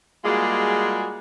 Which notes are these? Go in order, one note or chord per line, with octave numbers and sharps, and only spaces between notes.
G3 G#3 A#3 F4 F#4 G#4